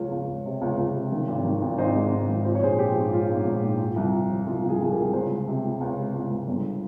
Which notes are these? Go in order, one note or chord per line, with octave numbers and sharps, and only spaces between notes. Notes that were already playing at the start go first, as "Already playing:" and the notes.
Already playing: C#2 F3 C#5 F5
C#2
C#2
C3
C#2
C#2
C3
D#3
G#1
D#3
G#1
G#1 C5 D#5
G#2
G#2
G#1
F3 C5
C#5
A#1 G#4 C5
F3 G4
G#2
F3 F4
G#2
A#1
G#2
F3
C2
F3
F3
C2 F4
C2
F4 G#4
C2 G#4
C2 G4 A#4
C#2 G#4 C5
C#2
C3
C#2
C#2
C3
C#2
C#2
G1